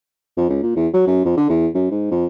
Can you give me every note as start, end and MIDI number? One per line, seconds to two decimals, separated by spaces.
0.37 0.47 41
0.49 0.60 37
0.63 0.73 46
0.76 0.88 40
0.94 1.03 54
1.07 1.21 42
1.25 1.34 41
1.37 1.49 50
1.50 1.68 40
1.74 1.88 42
1.91 2.08 44
2.11 2.26 41